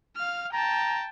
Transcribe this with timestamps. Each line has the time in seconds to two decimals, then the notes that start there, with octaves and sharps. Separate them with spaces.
0.17 F5 F6
0.53 G5 A5 A#5